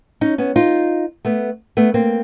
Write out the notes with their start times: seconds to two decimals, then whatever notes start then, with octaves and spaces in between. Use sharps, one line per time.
0.21 C#4 D#4
0.38 B3 C#4
0.56 D#4 F4
1.25 A3 B3
1.77 A3 B3
1.94 A#3 C4